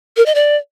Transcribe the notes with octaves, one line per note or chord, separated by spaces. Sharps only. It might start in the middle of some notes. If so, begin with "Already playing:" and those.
A#4
D#5
D5